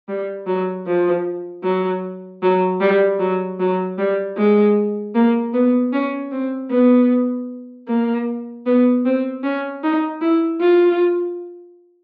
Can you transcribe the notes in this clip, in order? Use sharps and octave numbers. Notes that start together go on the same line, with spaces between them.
G3
F#3
F3
F#3
F#3
G3
F#3
F#3
G3
G#3
A#3
B3
C#4
C4
B3
A#3
B3
C4
C#4
D#4
E4
F4